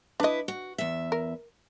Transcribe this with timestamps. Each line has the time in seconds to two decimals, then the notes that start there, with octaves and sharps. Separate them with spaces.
0.20 D4 E4 B4 D#5
0.48 F#4
0.78 E2 E5
1.12 A#4